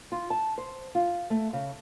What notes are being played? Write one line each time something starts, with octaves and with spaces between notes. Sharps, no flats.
F4
A5
C5
F4
A3
C#3